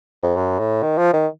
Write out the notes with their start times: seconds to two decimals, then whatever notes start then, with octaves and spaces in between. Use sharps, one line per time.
0.23 F2
0.36 F#2
0.59 A2
0.83 D#3
0.98 F3
1.13 D#3